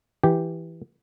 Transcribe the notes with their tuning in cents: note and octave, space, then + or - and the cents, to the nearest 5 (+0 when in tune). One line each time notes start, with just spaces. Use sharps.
E3 +0 G4 +0